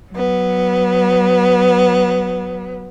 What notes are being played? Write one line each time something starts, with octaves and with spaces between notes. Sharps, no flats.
F#3 B3